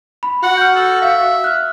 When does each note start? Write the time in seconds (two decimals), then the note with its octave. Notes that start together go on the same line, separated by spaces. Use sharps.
0.23 B5
0.43 F#4 F#5
0.57 F6 G6
0.76 A4
1.02 E5 F5
1.44 F6 F#6